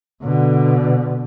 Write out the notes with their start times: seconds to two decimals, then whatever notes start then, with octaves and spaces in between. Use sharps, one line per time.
0.24 B2 D3